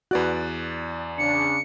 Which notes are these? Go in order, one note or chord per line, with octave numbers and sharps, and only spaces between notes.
E2 F#4 B4 D5 F#6
C#3 D4 C#7